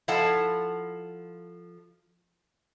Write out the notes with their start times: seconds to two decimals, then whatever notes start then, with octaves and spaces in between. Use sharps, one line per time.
0.08 F3 E4 A4 F5 F#5 A5